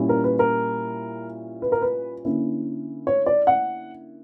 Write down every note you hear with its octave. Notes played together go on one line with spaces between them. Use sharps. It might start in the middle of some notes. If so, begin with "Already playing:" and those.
Already playing: A#2 G3 C#4 E4
A#4
B4
A#4
B4
A#4
B4
D3 A#3 C#4 E4
C#5
D5
F#5